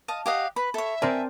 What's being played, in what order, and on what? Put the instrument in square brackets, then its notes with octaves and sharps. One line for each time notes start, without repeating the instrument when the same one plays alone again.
[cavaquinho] D#5 F5 A5
[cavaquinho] G4 D#5 F#5 [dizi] F5
[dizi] B4 [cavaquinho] B5
[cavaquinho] A4 C#5 [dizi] E5
[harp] C4 A#4 D5 [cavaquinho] G#5 A5